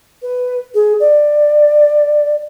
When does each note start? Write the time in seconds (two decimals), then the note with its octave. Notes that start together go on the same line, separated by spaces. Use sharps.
0.22 B4
0.75 G#4
1.00 D5